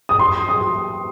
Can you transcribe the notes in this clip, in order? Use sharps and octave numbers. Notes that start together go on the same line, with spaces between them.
D#6
C6
D#6